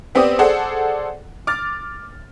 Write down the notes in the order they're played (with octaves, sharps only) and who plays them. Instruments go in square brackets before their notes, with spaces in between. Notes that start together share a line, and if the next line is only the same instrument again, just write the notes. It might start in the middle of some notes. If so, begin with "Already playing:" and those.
[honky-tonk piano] B3 C4 G4 D5 D#6
G#4 A4 C5 D5 F#5
D6 F6 A6